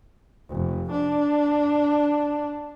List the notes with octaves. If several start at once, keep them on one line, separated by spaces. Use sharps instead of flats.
F1
D4